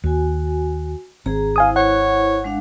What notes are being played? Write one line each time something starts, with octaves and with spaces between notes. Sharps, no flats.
D#2 F#4 G#5
G#1 C4 G#4 A#5
E4 C5 F5 G#5 D#6
C#5 F#5
G#3 D4 F5